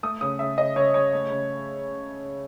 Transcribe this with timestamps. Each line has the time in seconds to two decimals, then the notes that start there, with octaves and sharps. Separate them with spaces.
0.03 A3 D#6
0.21 C#3 D#6
0.39 C#3 E5
0.57 C#3 D#5
0.76 C#3 C#5
0.94 C#3 C#5
1.13 A3
1.30 C#3